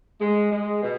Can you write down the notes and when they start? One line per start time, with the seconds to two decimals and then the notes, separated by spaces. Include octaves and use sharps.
0.21 G#3
0.52 G#3
0.83 B2